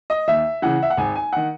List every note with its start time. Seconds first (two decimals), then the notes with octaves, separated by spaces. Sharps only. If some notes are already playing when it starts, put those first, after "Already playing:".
0.10 D#5
0.28 D#2 E5
0.62 C#3 E3 F#5
0.83 E5
0.90 F#5
0.97 G#1 G#5
1.16 G#5
1.33 D#3 F#5